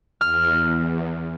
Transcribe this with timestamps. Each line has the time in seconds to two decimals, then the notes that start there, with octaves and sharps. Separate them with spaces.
0.21 E2 F6